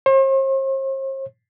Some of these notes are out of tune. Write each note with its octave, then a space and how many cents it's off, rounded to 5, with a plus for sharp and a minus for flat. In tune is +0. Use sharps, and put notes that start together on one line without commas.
C5 +45